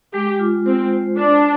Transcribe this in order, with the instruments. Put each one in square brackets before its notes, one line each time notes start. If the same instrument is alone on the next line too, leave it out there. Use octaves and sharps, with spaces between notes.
[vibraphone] G#3 [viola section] G4
[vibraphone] F4
[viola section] C4 [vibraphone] C5
[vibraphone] C5
[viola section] D4 [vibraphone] C5